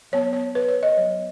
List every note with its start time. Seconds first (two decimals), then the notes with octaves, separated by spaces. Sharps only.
0.12 F#3 B3 C#5
0.33 C#5
0.55 B4
0.68 C#5
0.83 D#5
0.97 F#3 B3 C#5